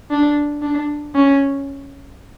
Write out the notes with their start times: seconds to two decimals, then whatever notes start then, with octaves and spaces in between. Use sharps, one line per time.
0.11 D4
0.62 D4
1.15 C#4